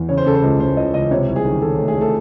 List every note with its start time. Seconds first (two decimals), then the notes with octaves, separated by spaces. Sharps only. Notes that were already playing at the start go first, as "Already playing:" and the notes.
Already playing: E2
0.09 C#3 C#5
0.18 C5
0.26 C#3 A4
0.35 C5
0.42 C#2
0.60 C#2 C5
0.77 C#2 D#5
0.94 C#2 D#5
1.11 C3 C#5
1.28 C2
1.36 G#4
1.45 D#3
1.61 D#3 A4
1.79 A3
1.88 G#4
1.95 A3
2.01 A4